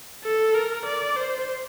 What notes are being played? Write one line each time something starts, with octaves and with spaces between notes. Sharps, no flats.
A4
A#4
D5
C5